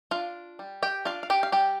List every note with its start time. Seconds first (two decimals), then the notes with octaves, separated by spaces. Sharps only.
0.11 D4 F4 F5
0.59 G3
0.83 G4 G5
1.05 D4 F4 F5
1.23 F5
1.30 G4 G5
1.43 F5
1.52 G3 G4 G5